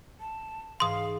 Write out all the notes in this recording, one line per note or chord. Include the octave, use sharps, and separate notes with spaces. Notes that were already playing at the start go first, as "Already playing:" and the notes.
A5
G#2 E3 G#4 F5 C6 D#6